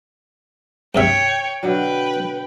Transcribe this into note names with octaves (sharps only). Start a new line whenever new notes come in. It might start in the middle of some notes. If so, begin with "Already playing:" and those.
G2 C3 C#5 E5 G5
B2 D3 F#3 B4 G5